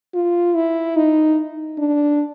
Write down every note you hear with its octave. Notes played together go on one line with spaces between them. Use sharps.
F4
E4
D#4
D4